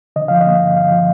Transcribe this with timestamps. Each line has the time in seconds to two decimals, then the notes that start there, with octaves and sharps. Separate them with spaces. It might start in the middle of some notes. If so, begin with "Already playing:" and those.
0.16 D3 D#5
0.28 F3 F5
0.41 D#5
0.47 A#3
0.61 G2
0.76 D3 F5
0.91 F3